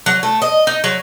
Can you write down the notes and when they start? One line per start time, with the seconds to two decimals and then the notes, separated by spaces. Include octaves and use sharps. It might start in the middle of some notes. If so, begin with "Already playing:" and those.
0.06 F#3
0.23 A3
0.42 D#5
0.67 D#4
0.84 F#3